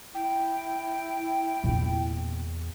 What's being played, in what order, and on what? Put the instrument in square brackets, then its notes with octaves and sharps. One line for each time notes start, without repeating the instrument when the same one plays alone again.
[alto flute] E4 [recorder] G5
[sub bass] E2 [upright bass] A#2 C4